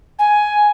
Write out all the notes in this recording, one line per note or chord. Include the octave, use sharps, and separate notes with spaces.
G#5